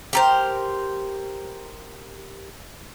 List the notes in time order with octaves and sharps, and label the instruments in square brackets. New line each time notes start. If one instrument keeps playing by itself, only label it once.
[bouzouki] G4 A#4 C5